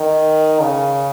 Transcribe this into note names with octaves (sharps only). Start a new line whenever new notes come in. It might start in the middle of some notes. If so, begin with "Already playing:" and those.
Already playing: D#3
C#3